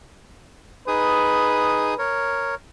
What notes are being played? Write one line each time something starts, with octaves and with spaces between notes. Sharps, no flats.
D#4 G#4 B4 D#6
A#4 C#5